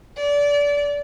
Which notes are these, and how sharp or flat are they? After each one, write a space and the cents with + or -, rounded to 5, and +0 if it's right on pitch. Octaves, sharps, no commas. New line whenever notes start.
D5 -25